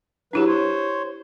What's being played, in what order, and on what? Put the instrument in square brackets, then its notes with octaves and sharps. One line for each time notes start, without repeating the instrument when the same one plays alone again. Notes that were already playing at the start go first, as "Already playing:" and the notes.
[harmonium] F#3 B4 [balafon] D4 E4 G4
[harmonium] C5 C#5